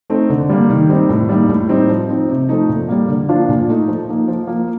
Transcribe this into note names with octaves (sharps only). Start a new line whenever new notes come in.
A3 C4 D#4
D3
G3 A#3
D#3
G3 C4 D#4
A2
G3 A#3 D#4
A2
G3 C4 D#4
F3
C4 D#4
C3
F3 A3 D#4
A#2
G3 A#3
D3
F3 A#3 D4 F4
A#2
A3 D#4
F3
A#3 D#4
F3
A#3 F4